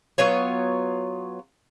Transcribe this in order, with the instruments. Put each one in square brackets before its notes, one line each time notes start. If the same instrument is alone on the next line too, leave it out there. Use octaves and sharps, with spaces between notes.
[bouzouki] F#3 B3 F4 C#5